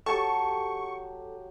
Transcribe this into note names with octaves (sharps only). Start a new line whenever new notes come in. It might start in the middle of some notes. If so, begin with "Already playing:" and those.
F#3 G4 A4 A5 C#6